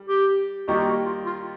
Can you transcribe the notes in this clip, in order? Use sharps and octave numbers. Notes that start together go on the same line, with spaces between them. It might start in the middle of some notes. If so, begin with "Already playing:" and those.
Already playing: G3
G4
D#3 G3 A#3 D#4 F#4 G4
F4
F#4
F4
F4